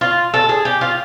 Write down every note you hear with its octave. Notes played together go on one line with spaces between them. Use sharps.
F4
A4
G#4
G4
F4